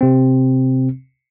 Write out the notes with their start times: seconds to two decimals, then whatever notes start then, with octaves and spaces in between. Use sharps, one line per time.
0.01 C3 C4